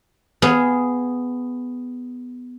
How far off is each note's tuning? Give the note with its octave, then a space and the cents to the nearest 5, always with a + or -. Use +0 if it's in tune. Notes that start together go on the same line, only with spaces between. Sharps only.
B3 +10 G#4 +0 F5 +0